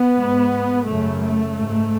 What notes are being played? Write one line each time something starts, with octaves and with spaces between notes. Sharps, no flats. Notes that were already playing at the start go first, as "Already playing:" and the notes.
Already playing: B3
G#2
F#2 C#3 A3
A3
G#2